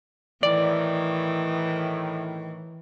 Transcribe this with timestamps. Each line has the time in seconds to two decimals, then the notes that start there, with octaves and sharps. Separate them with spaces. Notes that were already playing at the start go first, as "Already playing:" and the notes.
0.43 A2 D#3 E3 D5